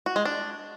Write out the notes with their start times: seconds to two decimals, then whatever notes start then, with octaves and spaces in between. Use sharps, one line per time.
0.06 F#4
0.16 G#3
0.25 D4